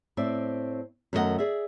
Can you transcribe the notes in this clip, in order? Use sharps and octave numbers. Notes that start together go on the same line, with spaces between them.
A2 C4 D5 E5
F#2 D#3 A3 D4 D#5 F#5
G#4 D5 E5